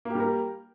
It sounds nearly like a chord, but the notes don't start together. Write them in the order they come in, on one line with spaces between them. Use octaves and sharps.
A#3 G4 G3 A#4